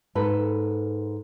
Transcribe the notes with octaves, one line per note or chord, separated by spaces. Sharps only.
G#2 A4 B4